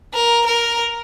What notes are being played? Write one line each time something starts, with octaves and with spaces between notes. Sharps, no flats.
A#4
A#4